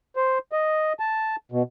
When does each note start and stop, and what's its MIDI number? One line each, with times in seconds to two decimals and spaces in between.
0.16 0.38 72
0.52 0.93 75
1.00 1.36 81
1.52 1.63 47